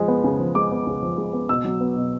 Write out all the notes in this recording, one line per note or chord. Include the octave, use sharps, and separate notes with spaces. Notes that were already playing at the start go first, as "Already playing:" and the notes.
Already playing: F3 G#3
B3
C#3
F3
G#3 D6
B3
C#3
F3
G#3
B3
B2 E6
F#3
B3
B2